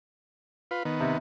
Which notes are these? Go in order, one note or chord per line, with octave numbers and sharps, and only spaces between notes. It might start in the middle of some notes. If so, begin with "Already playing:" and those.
F4 B4
D#3 B3
C3